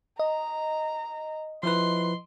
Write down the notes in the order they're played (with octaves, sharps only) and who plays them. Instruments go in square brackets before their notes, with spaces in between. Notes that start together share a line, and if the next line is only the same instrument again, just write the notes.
[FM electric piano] D#5 [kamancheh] A#5
[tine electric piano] F3 E4 B4 [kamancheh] C6